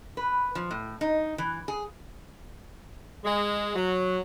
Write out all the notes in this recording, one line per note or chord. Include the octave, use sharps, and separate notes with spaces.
B4
F3
A2
D#4
E3
G#4
G#3
F#3